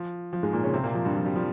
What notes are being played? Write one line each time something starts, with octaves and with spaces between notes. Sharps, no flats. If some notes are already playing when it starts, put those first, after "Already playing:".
Already playing: F3
F3
G#2 G#3
A#2 A#3
C#3 C#4
C3 C4
A#2 A#3
F3
G2 G3
F3
G3
F3